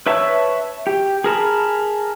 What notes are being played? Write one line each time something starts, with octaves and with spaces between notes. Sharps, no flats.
B4 C#5 E5 A5
G4
G#4 A#4 A5 B5